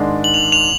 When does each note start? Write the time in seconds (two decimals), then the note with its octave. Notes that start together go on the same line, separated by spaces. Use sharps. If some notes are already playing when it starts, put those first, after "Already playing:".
Already playing: G#2 D#3 G#3 D4
0.24 F#7
0.34 F7
0.52 F7